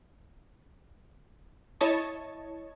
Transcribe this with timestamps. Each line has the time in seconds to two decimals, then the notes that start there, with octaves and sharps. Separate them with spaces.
1.81 E4 C#5 D#5 A5 C#6